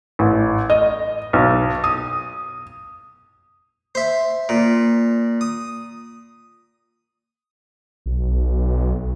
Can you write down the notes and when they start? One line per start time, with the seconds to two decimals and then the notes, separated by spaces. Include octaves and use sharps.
0.19 A1
0.70 D#5
1.33 B1
1.84 D#6
3.95 C5 E5
4.49 A#2
5.41 D#6
8.06 B1